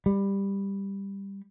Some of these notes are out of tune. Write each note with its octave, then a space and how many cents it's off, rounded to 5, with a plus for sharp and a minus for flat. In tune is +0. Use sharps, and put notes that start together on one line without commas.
G3 +10